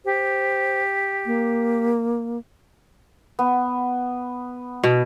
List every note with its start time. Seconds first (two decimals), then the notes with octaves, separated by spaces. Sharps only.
0.05 G4 C5
1.26 A#3
3.39 B3
4.84 B2